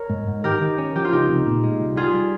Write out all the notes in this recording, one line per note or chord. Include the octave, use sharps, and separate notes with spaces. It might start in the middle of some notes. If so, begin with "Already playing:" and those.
Already playing: A#4 C#5
G#2
G#2
D#3 G4 A#4
D#3
C#4
F3 G4
F4
C#2 D#4 G4
C3
A#2
G#3
C2
G3 F4 G#4
G3